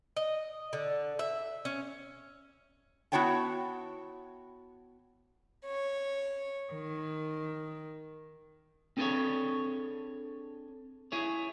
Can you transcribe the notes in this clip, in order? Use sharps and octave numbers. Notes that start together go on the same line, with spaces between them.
D#5
D3
E5
C#4
B3 E4 F#4 C#5 G5 A5
C#5
D#3
C4 D4 G#4 A4 B4 C#5
E4 G#4 C#5